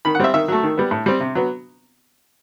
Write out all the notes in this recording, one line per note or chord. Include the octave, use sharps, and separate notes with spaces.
D#3 B5
F#5
G3 C4 E5
D#3 E5
F#3 A3
D#3
G3 B3
A2
G3 C4
C3
F#3 B3